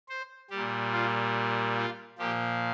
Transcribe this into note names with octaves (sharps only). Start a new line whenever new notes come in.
C5
A#2 G3 G4
F4
F4
A#2 F3 G4